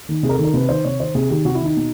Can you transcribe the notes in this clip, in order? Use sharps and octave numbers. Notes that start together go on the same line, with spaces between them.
D#3
C3 G#4
A#4
A4
D#3
A#4
C3 B4
D#3 C5
C3 C#5
D#3 C5
C3 G#4
D#3 G4
C3 F#4
E4
D#3 D#4
B2